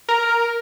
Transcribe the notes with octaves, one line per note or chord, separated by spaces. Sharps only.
A#4